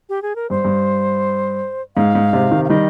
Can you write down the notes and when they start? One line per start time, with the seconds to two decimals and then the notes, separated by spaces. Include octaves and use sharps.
0.09 G4
0.22 G#4
0.36 A#4
0.50 G2 C5
0.65 G2
1.96 G#2 F5
2.15 G#2
2.33 G#2 C3
2.51 C3 D#3
2.65 F5
2.69 D#3 G3 D#5